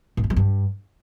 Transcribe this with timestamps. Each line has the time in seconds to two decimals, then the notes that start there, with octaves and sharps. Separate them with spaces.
0.17 G#2
0.24 A3
0.30 G#3
0.37 G2